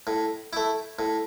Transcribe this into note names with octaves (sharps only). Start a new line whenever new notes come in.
A2
A3 E4
A2